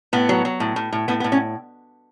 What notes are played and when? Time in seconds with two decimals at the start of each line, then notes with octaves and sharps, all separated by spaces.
0.13 A2 B3
0.29 F#3
0.45 F#3
0.60 A2
0.76 A2
0.92 A2
1.08 A2 B3
1.20 B3
1.24 A2
1.32 C#4